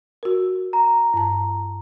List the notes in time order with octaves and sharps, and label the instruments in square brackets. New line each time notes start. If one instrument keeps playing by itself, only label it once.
[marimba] F#4 A#4
[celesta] A#5
[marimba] G2 A5